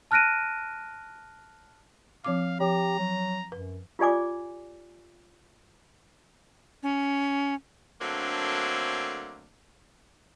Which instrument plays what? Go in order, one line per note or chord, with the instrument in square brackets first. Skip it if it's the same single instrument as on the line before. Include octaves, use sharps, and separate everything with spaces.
[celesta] A5 F6 F#6 A#6 D7 D#7
[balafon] F3 C4 D6 [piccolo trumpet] F5
[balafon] F3 [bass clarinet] G4 [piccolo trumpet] A#5
[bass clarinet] F#3
[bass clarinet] F#2 [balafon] B4
[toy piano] F4 G4 D5 G#5 D6
[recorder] C#4
[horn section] D3 F#3 A3 A#3 C4 D4